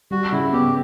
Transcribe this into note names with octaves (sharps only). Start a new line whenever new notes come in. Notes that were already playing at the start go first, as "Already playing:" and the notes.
G3 F#4
C#3 E4
B3 G4